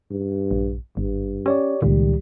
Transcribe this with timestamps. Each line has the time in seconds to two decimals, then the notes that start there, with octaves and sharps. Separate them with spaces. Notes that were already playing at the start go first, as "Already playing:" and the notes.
0.11 G2
0.51 A#1
0.97 G#1 G2
1.46 C#4 G4 C#5 D5
1.82 C#2 A#2 D#3 G3